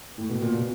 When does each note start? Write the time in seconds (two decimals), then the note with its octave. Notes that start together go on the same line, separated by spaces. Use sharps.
0.18 A2
0.29 B2
0.42 A#2
0.55 B2